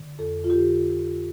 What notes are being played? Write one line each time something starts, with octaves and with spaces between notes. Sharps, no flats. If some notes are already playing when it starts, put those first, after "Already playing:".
Already playing: D3
F2 A4
F4
D3 G4